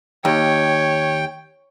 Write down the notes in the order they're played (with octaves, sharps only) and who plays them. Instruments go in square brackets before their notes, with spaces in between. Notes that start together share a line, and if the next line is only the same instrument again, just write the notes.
[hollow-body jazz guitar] D#2 [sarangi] C#5 [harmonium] G5